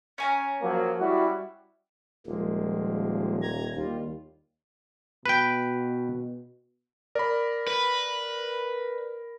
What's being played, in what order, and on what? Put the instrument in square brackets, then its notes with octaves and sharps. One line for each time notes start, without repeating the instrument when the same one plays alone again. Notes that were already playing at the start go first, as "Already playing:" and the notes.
[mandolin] C#4 G#5 A#5
[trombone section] F3 F#3 A#3
G3 E4 F#4
[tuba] D#1 [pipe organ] F3 G#3 A#3
[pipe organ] A#5 G#6
[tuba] D#2 [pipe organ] G3 F4
[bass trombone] B2 [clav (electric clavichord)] B4 G5
[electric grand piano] A#4 B5 [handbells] D5
[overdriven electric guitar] B4